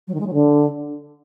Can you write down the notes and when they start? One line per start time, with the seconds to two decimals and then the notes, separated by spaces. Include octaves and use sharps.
0.07 F#3
0.14 D#3
0.20 G#3
0.27 F#3
0.33 D3